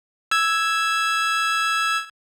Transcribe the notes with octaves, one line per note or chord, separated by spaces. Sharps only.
E6 G#6